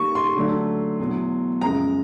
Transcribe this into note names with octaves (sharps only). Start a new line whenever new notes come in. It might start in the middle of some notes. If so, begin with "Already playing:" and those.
Already playing: D#3 G3 A#3 C#6
C6
D3 F#3 A3 D4
E2 B2 F#3
F#2 C#3 F3 G#3 A#5